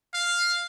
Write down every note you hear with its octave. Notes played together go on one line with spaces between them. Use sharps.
F5